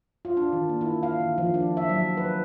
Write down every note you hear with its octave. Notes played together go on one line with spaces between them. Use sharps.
F4
D4
D#3
A#3
E4
F5
D#3
F3
D4
E5
F#3
B4